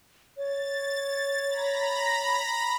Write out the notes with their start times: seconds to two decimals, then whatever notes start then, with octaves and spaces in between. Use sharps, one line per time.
0.37 C#5 A6
1.47 A#5 B5 A#6